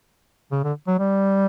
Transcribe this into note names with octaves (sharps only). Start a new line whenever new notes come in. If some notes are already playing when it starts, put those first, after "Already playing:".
C#3
D3
F#3
G3